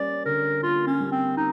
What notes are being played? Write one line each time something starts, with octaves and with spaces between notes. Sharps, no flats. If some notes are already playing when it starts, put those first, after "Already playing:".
Already playing: G3 A#3 C#4 D5
D3 A#4
A#3 F4
C#4
G3
C4
C#4 D#4